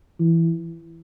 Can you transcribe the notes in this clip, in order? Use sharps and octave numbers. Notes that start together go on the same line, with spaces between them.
E3